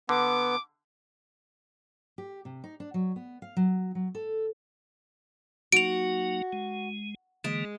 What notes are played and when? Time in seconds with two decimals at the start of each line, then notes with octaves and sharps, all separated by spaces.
0.09 D3 B3 D6
2.18 G4
2.45 C3
2.64 D#4
2.80 D4
2.94 F#3
3.16 B3
3.42 F5
3.57 F#3
3.95 F#3
4.15 A4
5.73 F#3 A#3 D#4 F#4 D7 F7
6.53 G#3
7.44 D3 E3 G#3 A#3